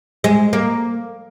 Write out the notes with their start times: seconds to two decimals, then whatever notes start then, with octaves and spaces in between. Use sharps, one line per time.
0.24 G#3
0.53 A#3